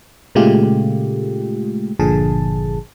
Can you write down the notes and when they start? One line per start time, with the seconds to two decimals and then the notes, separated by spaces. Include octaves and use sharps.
0.35 A#2 C#3 G#3 A3 F4 G4
1.99 G1 A#2 D3 F3 G#4 A5